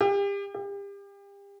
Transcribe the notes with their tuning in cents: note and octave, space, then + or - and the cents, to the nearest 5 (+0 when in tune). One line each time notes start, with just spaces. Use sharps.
G4 +35
G4 +35